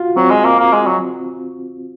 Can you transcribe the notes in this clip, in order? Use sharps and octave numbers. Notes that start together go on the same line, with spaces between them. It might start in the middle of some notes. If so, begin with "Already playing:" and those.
Already playing: F4 F#4
F#3 C4
G#3
A#3
A#3
G#3
F#3